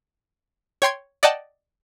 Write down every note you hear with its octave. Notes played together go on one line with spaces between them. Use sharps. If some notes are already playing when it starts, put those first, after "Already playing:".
C#5 G5 C6 G#6
D5 D#5 F#5 G5 A5